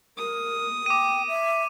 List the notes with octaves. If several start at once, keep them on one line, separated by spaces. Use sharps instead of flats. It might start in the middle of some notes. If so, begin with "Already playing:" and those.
A#4 D#6
G5 D6 D#7
E5